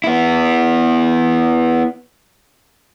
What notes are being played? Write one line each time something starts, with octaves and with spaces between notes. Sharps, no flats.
B3 E4